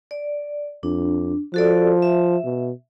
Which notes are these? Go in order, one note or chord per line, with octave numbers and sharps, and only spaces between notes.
D5
F2 D4
F3 F#4 A4 D5
E5
B2